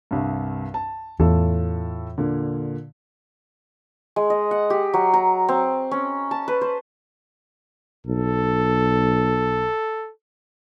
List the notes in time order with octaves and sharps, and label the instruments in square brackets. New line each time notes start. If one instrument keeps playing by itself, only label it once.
[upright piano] C2 G2
A5
[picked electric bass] E2 [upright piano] A2 F4 A4
[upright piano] A#2 D3
[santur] G#3
D#5
F#5
G4
F#3
A#5
C4
C#4
A5
B4
C5
[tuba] B1 [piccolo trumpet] A4